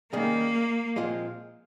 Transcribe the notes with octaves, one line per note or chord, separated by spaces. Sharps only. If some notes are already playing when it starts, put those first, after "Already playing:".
D#3 G3 A#3 C#4 G#4
A#2 F3 G#3 C4 F4